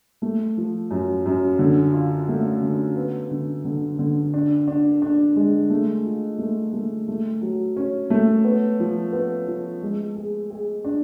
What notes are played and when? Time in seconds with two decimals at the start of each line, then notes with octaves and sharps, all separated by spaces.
0.22 A3
0.57 F3
0.91 F#2
1.26 F#2
1.59 D3
1.93 F4
2.28 A3
2.62 D3
2.97 B3
3.31 D3
3.65 D3
3.99 D3
4.34 D4
4.68 D4
5.02 D4
5.36 G#3
5.70 A3
6.05 F4
6.38 A3
6.73 A3
7.08 A3
7.41 F#3
7.76 C#4
8.10 A3
8.44 B3
8.79 F3
9.13 B3
9.47 F3
9.82 G#3
10.16 G#4
10.51 G#4
10.84 D4